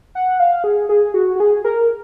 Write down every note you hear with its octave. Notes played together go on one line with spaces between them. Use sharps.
F#5
F5
G#4
G#4
F#4
F#4
G#4
A#4